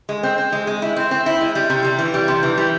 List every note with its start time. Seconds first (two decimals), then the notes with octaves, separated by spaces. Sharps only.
0.09 G#3
0.23 C4
0.38 C4
0.52 G#3
0.67 G#3
0.82 E4
0.96 C4
1.11 C4
1.26 E4
1.41 G#3
1.55 G3
1.70 C3
1.84 G3
1.99 E3
2.14 G3
2.28 C3
2.43 E3
2.58 G3